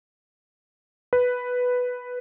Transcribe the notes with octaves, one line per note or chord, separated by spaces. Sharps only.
B4